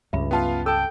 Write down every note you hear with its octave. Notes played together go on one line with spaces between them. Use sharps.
C#2 G2 E5 B5
B3 F4 F5 G5 A5
A4 G5 A5 E6